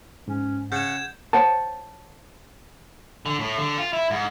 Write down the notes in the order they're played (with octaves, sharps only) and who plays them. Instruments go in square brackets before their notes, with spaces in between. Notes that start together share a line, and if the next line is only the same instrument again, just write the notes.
[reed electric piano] G#2 [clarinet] C#4
[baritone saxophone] C#3 [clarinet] F#5 [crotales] G6 G#6 E7
[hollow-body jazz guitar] C5 C#5 F#5 A5
[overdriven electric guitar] D3
A2
D3
F4
E4
G#2